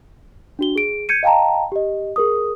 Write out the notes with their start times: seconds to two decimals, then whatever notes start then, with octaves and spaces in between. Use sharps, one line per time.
0.59 D4 F#4 G7
0.76 G#4 D7
1.09 G6 G#6 C#7 D#7
1.23 D#5 F5 G5 A5 A#5
1.72 G4 D#5
2.16 G#4 A#4 D#6